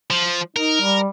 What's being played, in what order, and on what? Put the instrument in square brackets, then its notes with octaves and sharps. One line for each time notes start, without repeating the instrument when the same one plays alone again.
[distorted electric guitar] F3
[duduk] D#4 [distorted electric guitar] A#4
[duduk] G3